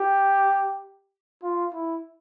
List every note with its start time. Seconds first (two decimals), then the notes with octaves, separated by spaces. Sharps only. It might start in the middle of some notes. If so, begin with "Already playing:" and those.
Already playing: G4
1.43 F4
1.73 E4